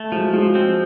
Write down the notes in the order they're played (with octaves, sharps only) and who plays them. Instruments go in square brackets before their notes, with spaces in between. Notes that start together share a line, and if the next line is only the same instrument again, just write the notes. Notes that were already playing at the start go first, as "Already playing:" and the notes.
Already playing: [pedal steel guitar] A3
[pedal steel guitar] F3 [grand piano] F#3 G#3
[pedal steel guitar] F3 [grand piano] F#3 G#3
[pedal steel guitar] C4